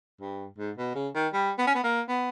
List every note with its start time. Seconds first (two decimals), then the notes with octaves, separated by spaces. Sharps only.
0.21 G2
0.58 G#2
0.77 B2
0.95 C#3
1.15 D#3
1.33 G3
1.58 B3
1.67 C#4
1.75 B3
1.84 A#3
2.08 B3